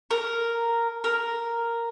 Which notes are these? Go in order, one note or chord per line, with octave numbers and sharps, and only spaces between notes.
A#4
A#4